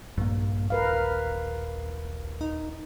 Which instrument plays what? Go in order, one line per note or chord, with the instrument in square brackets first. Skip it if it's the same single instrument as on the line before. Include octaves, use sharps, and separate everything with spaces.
[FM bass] A#1 [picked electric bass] G2 A#3
[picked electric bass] D#1 [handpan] A#4 B4 F5
[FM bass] D#4